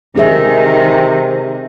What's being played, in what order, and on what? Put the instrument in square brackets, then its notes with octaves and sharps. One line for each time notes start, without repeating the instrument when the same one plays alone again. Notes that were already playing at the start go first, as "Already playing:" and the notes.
[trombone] C3 [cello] D#3 [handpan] D#4 G#4 E5